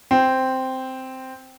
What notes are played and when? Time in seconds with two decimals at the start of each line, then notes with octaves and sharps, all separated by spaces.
0.11 C4